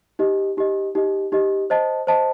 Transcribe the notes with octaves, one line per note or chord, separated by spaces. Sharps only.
D#4 G4 D#5
D#4 G4 D#5
D#4 G4 D#5
D#4 G4 D#5
C5 D#5 A5
C5 D#5 A5